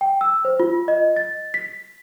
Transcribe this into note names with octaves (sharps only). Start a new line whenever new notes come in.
G5
E6
C5
F4
D#5
A6
B6